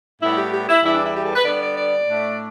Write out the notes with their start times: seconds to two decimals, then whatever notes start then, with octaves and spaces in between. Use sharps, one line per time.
0.21 A2 G3 B3 E4
0.36 G4
0.53 G4
0.68 E4
0.82 E2 E3 G3 D4 E4
0.94 D4
1.04 E4
1.14 G4
1.25 A4
1.35 B4
1.44 D3 G3 B3 D4 D5
1.61 D5
1.75 D5
2.06 A2 A3 D4